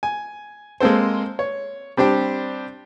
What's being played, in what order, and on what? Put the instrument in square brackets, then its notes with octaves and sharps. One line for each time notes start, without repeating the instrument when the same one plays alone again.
[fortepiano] G#5
G#3 A#3 C4 A4 C5
C#5
G3 C4 D4 G4 C5